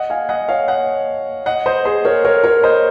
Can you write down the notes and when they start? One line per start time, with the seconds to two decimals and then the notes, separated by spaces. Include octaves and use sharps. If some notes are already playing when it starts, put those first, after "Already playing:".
Already playing: D#5 F#5
0.10 F5 G#5
0.29 D#5 F#5
0.48 C#5 F5
0.68 D#5 F#5
1.46 D#5 F#5
1.66 C5 D#5
1.85 G#4 C5
2.05 A#4 C#5
2.25 A#4 C#5
2.44 A#4 C#5
2.63 C5 D#5